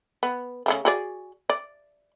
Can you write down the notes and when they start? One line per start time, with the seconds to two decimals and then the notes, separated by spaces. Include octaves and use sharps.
0.23 B3
0.66 C#3 G#3 A3
0.85 F#4 G#4 D5
1.50 D5